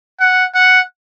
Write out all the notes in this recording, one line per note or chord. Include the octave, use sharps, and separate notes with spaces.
F#5
F#5